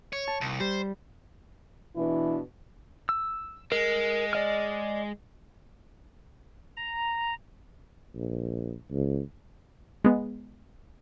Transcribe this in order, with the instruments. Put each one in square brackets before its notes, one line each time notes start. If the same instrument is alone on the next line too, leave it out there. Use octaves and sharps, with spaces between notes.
[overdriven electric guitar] C#5
[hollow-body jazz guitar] A5
[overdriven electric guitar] C2
[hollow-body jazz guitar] G3 [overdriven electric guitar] C5
[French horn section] B2 E3 D4 E4
[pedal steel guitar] E6
[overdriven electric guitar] G#3 [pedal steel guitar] A#4
[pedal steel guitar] D5 D#5 F6
[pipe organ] A#5
[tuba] A#1
C#2
[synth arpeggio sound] G#3 B3